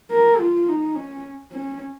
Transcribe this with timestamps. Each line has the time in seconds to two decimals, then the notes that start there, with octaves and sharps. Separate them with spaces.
0.11 A#4
0.39 F4
0.68 D#4
0.95 C#4
1.52 C#4